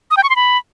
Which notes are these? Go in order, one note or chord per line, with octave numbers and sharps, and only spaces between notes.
D#6
G5
C#6
C6
B5